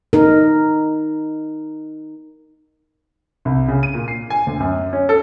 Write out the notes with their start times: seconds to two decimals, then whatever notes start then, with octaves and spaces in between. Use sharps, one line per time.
0.13 D#4 A#4
3.45 C2
3.68 C#3
3.83 D#7
3.94 A#2
4.08 C7
4.30 G#5
4.47 D2
4.60 F#2
4.93 C#4
5.09 A4